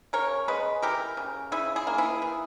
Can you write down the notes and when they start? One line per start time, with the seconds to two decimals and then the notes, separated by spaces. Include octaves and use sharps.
0.13 C#3 A#4 C#5
0.48 G#3 G#4 B4
0.82 E3 G4 A#4
1.17 C#3
1.52 C#3 E4 G#4
1.76 E4 G#4
1.87 A#3
1.98 E4 G#4
2.22 E3